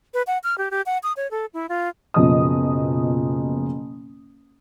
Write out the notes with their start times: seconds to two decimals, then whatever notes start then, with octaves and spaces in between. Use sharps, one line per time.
0.14 B4
0.27 F#5
0.44 F6
0.58 G4
0.71 G4
0.86 F#5
1.03 D#6
1.17 C#5
1.31 A4
1.54 E4
1.69 F4
2.14 F#1 B2 F3 D#5 D#6